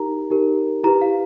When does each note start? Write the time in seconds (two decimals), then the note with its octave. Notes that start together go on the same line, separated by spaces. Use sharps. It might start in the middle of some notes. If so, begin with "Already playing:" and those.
Already playing: D#4 G4 A#4 A#5
0.31 D#4 G4 A#4
0.84 E4 G4 B4 A#5
1.01 F5